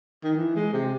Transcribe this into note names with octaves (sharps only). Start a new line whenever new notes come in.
D#3
E3
G#3
C3